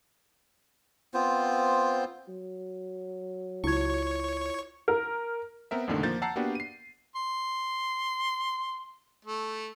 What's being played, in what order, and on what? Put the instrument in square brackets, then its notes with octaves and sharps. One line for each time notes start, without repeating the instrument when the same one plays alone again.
[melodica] B3 C4 F4 C5
[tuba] F#3
[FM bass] C#2 [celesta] E4 F4 G#6 [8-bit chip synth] C#5 C#6
[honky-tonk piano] A#4
[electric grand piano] B3 C4 A#4 E5
C2 F2 A#2 D3 D#3 A3
F3 A#3 G6 A6
F#5 A5 A#5 E6 C7
A#3 B3 D4 F#4 G4 B4
C7 D#7
[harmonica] C6
A3